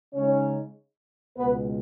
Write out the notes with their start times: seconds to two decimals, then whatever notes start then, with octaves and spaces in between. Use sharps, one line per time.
0.14 C#3 G#3 C#4 D#4 C#5
1.37 C#2 B2 G#3 B3 B4